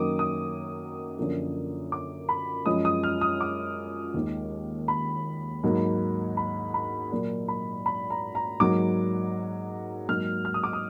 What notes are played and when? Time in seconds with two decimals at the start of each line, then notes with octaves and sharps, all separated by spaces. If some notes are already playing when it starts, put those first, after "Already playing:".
Already playing: F#2 D#3 F#3 A#3 D6 D#6
0.19 D#6
1.18 F#2 D3 F3 A#3
1.92 D6
2.29 B5
2.66 F#2 F3 G#3 D#6
2.85 D#6
3.03 F6
3.21 D#6
3.41 D6
4.14 D#2 D#3 G#3
4.88 B5
5.63 G#2 F#3 A#3
6.37 B5
6.74 B5
7.12 A#2 F#3 A#3
7.48 B5
7.86 B5
8.10 A#5
8.35 A#5
8.60 G#2 F#3 A#3 D6
10.08 G#2 F#3 A#3 F6
10.45 F6
10.54 D#6
10.64 D6
10.73 D#6